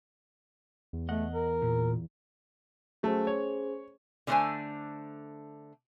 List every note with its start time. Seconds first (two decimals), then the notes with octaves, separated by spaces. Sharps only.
0.93 E2
1.09 A3 D#5 F#5
1.35 A#4
1.62 A#2
3.03 F#3 A3 C#4 G#4 C5
3.27 C#5
4.27 D3 G3 A3 D4 C5 G#5